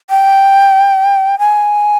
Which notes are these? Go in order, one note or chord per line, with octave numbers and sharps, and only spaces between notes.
G5
G#5